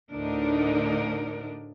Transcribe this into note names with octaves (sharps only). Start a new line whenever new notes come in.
D2 A2 D3 D4 D#4 A#4